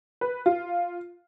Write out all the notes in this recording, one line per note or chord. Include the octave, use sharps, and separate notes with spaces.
B4
F4